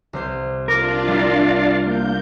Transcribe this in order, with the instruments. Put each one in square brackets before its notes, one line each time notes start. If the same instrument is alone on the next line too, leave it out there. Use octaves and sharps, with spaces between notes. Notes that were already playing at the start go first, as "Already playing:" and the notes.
[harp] C2 C5 C7
[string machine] D4 F4 [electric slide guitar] A#4 [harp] D6 F6 A6
[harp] G3 E4 C7 [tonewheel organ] D5 F5
[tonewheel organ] A#3 [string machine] G6